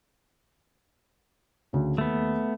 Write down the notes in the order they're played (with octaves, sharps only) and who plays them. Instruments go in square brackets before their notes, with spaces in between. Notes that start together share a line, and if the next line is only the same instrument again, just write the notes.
[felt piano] D2 C#3
[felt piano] D#2 [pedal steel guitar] A3 B3